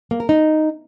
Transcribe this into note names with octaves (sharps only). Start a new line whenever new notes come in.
A#3
A#4
D#4